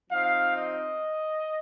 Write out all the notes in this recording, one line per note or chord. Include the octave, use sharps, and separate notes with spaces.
F3 C4 D#4 F5
D#5